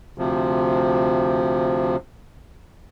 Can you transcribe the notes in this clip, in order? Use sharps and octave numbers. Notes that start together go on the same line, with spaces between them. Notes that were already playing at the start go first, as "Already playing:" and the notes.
D2 C3 F3